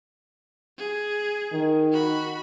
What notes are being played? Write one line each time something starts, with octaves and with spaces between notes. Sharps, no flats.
G#4
D#3
F#4 B5